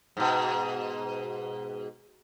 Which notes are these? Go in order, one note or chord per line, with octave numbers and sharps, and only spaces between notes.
G#2 B2